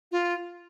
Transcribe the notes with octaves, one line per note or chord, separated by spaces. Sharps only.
F4